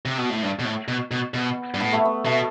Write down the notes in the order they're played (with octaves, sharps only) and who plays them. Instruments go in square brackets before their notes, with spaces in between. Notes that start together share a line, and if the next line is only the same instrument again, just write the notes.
[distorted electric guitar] C3
B2
A2
G2
B2
A2
B2
B2
[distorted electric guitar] B2 [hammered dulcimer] B3
[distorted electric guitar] G2
[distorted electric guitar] A2 [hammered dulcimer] B3
[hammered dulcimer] A3
B3
[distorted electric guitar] B2 [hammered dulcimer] A3